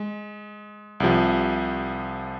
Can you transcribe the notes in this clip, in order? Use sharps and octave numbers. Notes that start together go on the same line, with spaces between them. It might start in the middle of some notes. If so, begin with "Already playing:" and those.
Already playing: G#3
C2 C3 F3